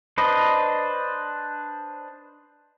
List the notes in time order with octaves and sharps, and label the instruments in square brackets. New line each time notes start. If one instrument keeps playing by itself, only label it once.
[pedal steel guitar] D4 B4 C5 D#5